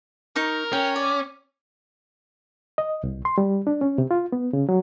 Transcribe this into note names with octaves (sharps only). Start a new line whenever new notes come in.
D#4 A#4 C#6
C#4 G5
D5
D#5
C2
C6
G3
D4
C#4
C3
F4
B3
C#3
F#3